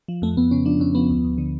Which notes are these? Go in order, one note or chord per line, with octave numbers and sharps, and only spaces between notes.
F3
F2 A3
F2 B3
C#3 C#4
F3 D4
F2 C#4
F3 B3
D2
D2
D3